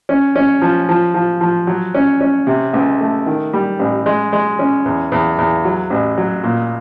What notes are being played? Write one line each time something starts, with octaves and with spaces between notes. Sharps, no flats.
C#4
C#4
F3
F3
F3
F3
F#3
C#4
C#4
C3
C#2
A3
D#3
G3
A1
G#3
G#3
C#4
E2
E2
E2
F#3
A1
F#3
A#2